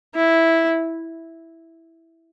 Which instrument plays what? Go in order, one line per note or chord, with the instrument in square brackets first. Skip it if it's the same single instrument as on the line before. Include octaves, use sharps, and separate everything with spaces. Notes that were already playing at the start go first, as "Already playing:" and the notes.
[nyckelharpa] E4